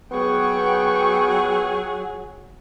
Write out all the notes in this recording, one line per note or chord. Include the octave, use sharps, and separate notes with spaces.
F#3 B3 G#4 G5 C#6